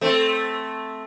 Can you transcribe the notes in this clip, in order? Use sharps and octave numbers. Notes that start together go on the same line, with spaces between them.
A3 C4